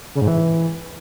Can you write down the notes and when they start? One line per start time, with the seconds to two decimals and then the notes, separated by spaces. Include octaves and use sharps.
0.15 C#3
0.21 G#2
0.27 E3